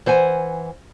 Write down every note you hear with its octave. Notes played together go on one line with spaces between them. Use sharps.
E3 C5 F#5 G#5